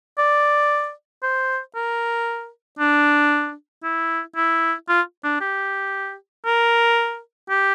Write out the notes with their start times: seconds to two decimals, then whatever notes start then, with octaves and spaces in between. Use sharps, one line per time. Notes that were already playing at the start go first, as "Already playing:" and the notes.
0.18 D5
1.23 C5
1.75 A#4
2.79 D4
3.84 E4
4.36 E4
4.89 F4
5.24 D4
5.41 G4
6.46 A#4
7.50 G4